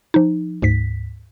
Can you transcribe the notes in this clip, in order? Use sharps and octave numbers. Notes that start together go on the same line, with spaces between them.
F3 D#4
D2 G#2 B6